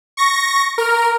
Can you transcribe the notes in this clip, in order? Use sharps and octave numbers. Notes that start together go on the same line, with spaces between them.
C#6 A#6
A#4